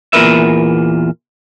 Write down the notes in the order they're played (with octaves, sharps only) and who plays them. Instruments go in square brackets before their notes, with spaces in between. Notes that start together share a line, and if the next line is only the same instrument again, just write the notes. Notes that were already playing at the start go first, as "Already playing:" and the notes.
[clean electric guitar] E2 A#2 A3 A#4 B4 E5